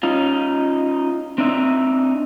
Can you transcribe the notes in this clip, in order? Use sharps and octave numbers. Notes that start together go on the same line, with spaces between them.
C#4 D#4 F4
C4 D4 D#4 E5